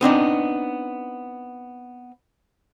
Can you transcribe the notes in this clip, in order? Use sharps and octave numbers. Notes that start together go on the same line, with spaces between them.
B3 C4 D4 D#4